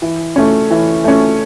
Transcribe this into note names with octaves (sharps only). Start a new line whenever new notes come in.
E3
A3 C#4
E3
A3 C#4